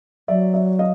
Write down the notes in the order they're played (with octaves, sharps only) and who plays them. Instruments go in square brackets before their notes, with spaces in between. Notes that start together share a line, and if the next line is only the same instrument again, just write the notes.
[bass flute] F#3 [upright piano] D5 E5
[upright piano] D5 E5
D#5 F5